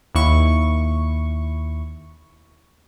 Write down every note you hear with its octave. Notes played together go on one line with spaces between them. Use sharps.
D#2 E4 C#6